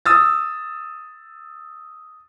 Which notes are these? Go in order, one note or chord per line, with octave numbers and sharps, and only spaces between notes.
D#6 E6 A6